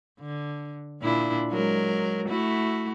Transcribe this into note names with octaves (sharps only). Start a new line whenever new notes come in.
D3
A#2 D4 E4
F#3 G#3 A#4
A3 E4 F#4